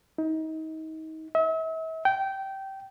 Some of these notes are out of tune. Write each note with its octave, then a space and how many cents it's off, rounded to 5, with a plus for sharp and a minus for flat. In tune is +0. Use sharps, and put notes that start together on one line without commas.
D#4 +30
E5 -40
G5 -20